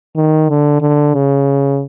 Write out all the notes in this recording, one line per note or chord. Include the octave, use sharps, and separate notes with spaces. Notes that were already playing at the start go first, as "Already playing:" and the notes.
D#3
D3
D3
C#3